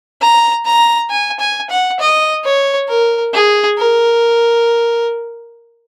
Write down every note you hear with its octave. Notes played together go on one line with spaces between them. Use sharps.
A#5
A#5
G#5
G#5
F#5
D#5
C#5
A#4
G#4
A#4